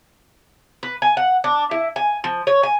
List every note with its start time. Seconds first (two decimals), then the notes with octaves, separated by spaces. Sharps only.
0.83 B4
1.02 G#5
1.17 F#5
1.44 D4
1.71 E4
1.96 G#5
2.24 F3
2.47 C#5
2.63 G#5